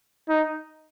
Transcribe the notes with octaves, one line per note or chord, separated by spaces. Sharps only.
D#4